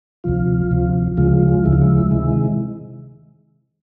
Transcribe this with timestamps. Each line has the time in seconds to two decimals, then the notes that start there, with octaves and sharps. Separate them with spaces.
0.24 D2 C3 F3 F4
0.71 D2 C3 F3
1.17 D2 C#3 F3 G#3 F4
1.33 F4
1.48 F4
1.64 D2 C#3 F3 G#3 E4
1.73 F4
1.81 E4
2.11 C3 D#3 G#3